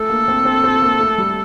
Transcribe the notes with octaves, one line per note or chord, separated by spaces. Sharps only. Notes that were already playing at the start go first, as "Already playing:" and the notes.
Already playing: A3 A4
A#3
C4
C4
C4
A#3
A3
G3